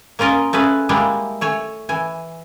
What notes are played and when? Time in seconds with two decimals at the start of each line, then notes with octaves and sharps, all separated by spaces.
0.19 A#3 C#4 F4 A#4 D#5
0.53 A3 C#4 G#4 B4
0.89 G3 G#3 A#3 D4 E4
1.41 A3 C#5 G#5
1.89 E3 G#5